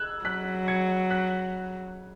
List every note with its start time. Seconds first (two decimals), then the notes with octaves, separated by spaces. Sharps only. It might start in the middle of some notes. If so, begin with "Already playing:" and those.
Already playing: E6 F#6 G#6
0.25 F#3 F#6 B6
0.68 G#6 C#7
1.10 F#6 B6